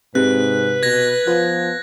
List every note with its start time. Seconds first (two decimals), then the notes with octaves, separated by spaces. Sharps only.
0.15 G#2 C3 B4 F#6
0.83 B2 G#6 A#6
1.27 F3 B3 F4